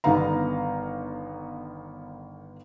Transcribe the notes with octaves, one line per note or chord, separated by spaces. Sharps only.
G1 D3 D#3 B3 F5 A#5